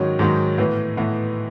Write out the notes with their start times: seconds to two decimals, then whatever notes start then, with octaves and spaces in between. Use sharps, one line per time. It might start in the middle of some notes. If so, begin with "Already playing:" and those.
Already playing: G#2 D#3 F#3 C#4
0.19 G#2 D#3 F#3 C#4
0.58 A2 E3 B3
0.97 A2 E3 B3